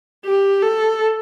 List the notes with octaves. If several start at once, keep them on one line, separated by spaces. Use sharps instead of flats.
G4
A4